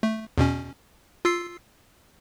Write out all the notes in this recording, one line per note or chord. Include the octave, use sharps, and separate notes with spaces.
A3
E2 B2 C#4
F4 E6 C7